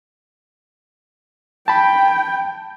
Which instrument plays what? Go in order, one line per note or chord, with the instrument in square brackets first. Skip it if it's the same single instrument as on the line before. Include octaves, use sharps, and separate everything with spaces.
[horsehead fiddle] G5 [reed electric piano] A5 B5